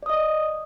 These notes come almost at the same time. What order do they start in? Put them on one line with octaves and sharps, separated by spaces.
D5 D#6 D#5